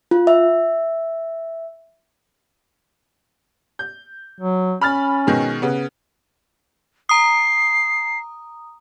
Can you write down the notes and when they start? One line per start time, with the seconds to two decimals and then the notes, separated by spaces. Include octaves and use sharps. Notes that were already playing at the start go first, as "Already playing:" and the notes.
0.11 F4
0.27 E5
3.79 G6
4.40 F#3
4.81 C#4 B5 F6 A6
5.27 B2 D#3 G#3
5.62 C#3 B3
7.09 A#5 D#6 C7